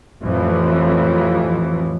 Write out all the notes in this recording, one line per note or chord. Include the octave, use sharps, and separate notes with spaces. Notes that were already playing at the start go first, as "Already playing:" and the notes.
A1 F2 A2 E3 F3